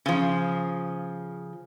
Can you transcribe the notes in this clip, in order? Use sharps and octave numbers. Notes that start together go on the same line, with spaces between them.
C#3 F3